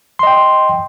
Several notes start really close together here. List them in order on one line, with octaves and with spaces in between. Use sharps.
C6 D#5 G5